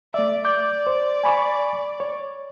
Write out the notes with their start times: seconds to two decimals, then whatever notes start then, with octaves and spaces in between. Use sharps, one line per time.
0.14 A3 D5 E5
0.45 D5 D6 G6
0.87 C5
1.24 G#5 B5 C#6
2.00 C#5